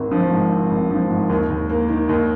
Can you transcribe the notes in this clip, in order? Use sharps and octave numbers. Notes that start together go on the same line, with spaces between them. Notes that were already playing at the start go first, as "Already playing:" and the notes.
Already playing: G#1 C4
F3
G#2
C4
G#1
F3
G#2
D#2
D#2
A#3
D#3
D#2